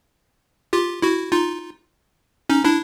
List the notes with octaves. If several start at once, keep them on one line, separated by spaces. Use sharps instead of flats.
F4 G4
E4 F#4
D#4 F4
C#4 D#4
D4 E4